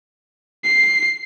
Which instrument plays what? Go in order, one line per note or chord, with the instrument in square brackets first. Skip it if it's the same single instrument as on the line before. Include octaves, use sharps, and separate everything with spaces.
[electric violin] C7